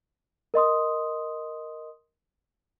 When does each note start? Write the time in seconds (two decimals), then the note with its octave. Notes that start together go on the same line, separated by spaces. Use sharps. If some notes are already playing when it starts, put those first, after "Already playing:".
0.54 A#4 D#5 C6 D#6